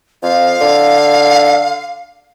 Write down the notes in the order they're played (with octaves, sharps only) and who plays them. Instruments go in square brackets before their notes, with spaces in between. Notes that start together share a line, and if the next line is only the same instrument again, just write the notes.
[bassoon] F2 [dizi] F5
[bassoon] D3